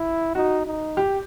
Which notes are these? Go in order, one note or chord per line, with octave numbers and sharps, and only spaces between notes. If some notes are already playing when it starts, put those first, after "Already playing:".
Already playing: E4
D#4 F#4
D#4
G4